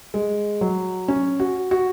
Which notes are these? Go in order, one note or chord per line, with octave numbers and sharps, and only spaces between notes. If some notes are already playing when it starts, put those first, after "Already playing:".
G#3
F#3
C#4
F#4
F#4